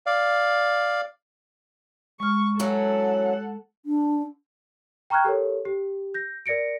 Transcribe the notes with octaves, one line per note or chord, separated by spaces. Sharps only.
D5 F5
G#3 C#6 F6
E3 F#3 C#4 A4 F#5
D4
G5 A#5 C#6 F6 F#6 G#6
G4 A4 A#4 C#5
G4
G6 A#6
A#4 D5 A#6 C#7 D7